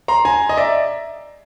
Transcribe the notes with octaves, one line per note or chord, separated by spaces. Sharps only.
A#5 C6
G#5 A#5
D#5
D5 E5